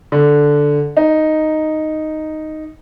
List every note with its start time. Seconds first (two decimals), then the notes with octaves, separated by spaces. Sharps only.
0.12 D3
0.97 D#4